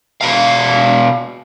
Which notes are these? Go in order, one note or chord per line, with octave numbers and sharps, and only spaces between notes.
B2 F5